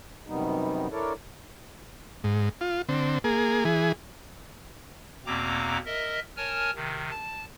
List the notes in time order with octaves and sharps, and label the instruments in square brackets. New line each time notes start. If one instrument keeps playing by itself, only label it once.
[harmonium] F#2 C3 D#3 G3 B3 D#4
D4 E4 A4 A#4 C#5 D5
[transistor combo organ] G#2
F4
D3 C4
A#3 G#4
E3 G#4
[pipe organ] E2 B2 A#3 C4 A#5 D6
A#4 D#5 E5
A#4 C#5 G#5 A5 F6
C3 D#3
A5